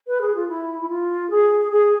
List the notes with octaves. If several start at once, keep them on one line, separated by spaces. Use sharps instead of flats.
B4
G#4
F4
E4
E4
F4
G#4
G#4